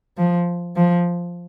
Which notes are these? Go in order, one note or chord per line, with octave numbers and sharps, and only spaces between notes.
F3
F3